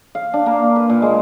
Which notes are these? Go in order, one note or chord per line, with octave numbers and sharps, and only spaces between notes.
F5
D4
A#3
B4
A#2
G#3